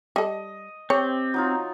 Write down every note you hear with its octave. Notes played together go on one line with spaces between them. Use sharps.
G3 A4 D#5
C4 G4 C#5
F#3 D#4 F4